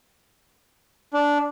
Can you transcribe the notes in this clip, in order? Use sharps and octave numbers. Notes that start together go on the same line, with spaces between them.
D4